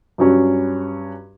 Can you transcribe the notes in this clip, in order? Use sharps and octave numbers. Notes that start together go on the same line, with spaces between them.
G2 F#3 C#4